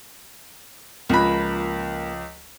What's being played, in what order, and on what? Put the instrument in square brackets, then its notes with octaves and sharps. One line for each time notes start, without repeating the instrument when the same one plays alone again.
[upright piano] C#2 F3 F#6 [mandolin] A#3 B5